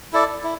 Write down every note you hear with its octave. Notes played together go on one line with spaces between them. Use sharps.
E4 A4 D5
E4